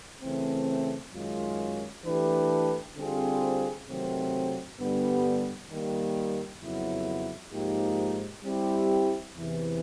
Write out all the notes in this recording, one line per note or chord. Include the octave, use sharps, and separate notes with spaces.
C#3 E3 A3 C4
F#2 D#3 G#3 C#4 F4
E3 A3 D4 G4 B4
D3 G3 C4 F4 G#4
C3 D#3 F#3 A3 C4
G2 D3 G3 B3
D#3 G3 A#3
F2 C#3 F#3 B3 E4
G#2 F3 A#3 D#4 G4
G3 C4 E4 G4
E2 C3 E3